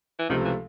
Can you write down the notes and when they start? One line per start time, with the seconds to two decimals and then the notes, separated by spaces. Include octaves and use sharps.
0.19 E3
0.29 C#2 C3 D#3 F3 A3
0.45 E3